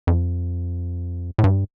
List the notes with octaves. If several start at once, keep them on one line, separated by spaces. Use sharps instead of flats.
F2
A2
G2